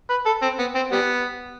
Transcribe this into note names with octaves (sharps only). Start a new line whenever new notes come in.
B4
A4
C4
B3
C4
G3 B3